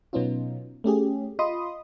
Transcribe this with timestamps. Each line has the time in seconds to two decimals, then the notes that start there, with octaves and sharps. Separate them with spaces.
0.13 B2 F#3 B3 C#4 D#4 F4
0.84 A3 C#4 G4 G#4
1.39 F4 D#5 B5 C6 D#6